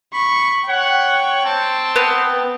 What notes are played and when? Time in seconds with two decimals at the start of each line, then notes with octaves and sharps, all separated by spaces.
0.14 B5 C#6
0.69 C#5 F#5 G5
1.45 C4 A5
1.96 B3